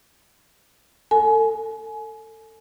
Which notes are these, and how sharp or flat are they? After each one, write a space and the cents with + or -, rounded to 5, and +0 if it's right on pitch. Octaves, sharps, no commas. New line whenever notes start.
A4 +25 G#5 +30